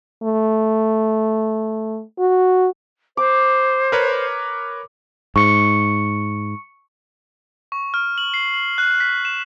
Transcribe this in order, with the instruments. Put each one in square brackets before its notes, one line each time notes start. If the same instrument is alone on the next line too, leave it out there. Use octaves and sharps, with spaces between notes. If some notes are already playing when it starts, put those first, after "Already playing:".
[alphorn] A3
F#4
[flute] C5 [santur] D6
[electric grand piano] A#4 B4 C#5
[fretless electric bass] G#2 [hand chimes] C#6 C#7
[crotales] C#6
F6
F#7
C7
F#7
F#6
B6
E7